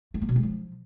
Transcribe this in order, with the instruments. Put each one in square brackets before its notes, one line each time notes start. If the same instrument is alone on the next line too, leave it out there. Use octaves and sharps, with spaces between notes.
[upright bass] A3
A#3
B2
G#3
F3